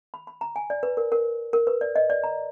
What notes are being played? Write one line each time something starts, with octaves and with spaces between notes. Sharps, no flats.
B5
B5
A#5
G#5
D5
B4
A#4
A#4
A#4
B4
D5
D#5
D5
A#5